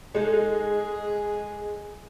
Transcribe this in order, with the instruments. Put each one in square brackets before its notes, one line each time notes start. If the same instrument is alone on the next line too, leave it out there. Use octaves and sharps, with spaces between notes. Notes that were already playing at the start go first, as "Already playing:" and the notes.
[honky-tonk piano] G#3 [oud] D#4 A4 [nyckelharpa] G#4